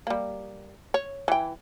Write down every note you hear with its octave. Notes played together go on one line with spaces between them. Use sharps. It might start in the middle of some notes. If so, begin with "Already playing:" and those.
G3 A#3
C#5
E3 G5